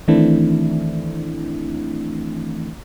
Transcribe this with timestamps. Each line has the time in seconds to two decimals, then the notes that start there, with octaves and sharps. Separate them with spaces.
0.08 D#3 E3 A3 C4 D4 E4